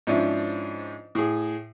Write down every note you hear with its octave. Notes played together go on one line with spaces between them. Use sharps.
G#2 F3 C#4 D4 E4
A2 G#4